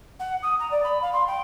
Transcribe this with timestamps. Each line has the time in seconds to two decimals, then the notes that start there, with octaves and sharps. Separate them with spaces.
0.19 F#5
0.42 D#6
0.59 A#5
0.70 D5
0.83 B5
1.01 F5
1.13 C6
1.27 G5